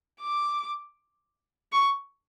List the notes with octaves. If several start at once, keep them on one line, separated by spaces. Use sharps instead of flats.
D6
C#6